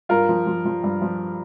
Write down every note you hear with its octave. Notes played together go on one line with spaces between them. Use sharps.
G2 F4 A#4
F3
F3
F3
G2
F3